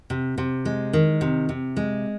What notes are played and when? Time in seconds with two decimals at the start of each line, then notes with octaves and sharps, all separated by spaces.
0.10 C3
0.38 C3
0.65 G#3
0.93 D#3
1.21 C3
1.49 C3
1.77 G#3